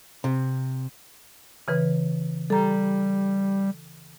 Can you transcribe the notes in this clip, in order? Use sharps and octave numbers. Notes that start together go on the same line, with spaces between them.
C3
C#3 E3 B4
G3 A4 A#5